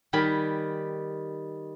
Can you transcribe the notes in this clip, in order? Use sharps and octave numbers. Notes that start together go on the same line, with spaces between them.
D#3 G3 G#5 B5